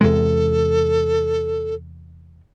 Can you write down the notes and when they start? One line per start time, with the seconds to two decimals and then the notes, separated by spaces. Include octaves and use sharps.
0.01 E2 C3 G#3 A4